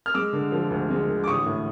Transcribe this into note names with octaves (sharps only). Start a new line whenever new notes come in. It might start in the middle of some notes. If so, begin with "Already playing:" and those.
F6
G#3 D6 E6
D3
F3
D2
G#3
D3
D6
A1 C#6 D#6
A2